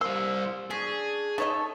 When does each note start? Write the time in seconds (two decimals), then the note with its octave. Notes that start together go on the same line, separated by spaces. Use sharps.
0.01 G3 A#3 C5 E6
0.70 C#4 D4 G#4
1.38 A3 D#4 A4 C#5 D#5 A5